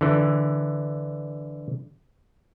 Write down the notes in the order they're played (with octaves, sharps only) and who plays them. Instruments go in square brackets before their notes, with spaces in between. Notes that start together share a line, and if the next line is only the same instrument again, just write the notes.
[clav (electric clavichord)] D3 E3